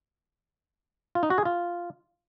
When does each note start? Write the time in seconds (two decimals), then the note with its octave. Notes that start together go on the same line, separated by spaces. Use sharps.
1.15 F4
1.23 D#4
1.30 F#4
1.38 G#4
1.45 F4